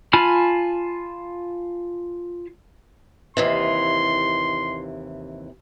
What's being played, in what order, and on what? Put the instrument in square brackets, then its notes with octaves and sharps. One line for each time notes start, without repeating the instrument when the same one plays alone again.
[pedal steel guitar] F4 G#5 A5 B5 F6
[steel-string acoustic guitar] D#2 C3 E3 [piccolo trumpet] C6